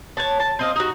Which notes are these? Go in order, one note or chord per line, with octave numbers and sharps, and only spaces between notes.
C#5 F#5 A5
A5
C4 D#5 F5
D#4 F#4